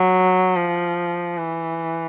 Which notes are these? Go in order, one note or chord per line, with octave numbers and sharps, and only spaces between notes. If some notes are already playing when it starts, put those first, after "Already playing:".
Already playing: F#3
F3
E3